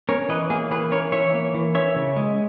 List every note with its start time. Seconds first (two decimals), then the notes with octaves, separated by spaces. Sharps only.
0.09 C#4 A#4 C#5
0.29 E3 B4 D#5
0.50 A#3 G#4
0.71 E3 G#4 B4
0.92 C#4 A#4 C#5
1.12 E3 C#5 E5
1.34 A#3
1.54 E3
1.75 C#4 C#5 E5
1.96 C#3
2.16 G#3